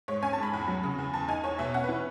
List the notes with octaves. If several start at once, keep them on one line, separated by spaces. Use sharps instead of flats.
G#2 C#5
C#4 G#5
A5
G#2 B5
E2
F#3
C#3
E2
E2 A5
D#4 G#5
E2 C#5
B2 E5
C#4 F#5
E3 B4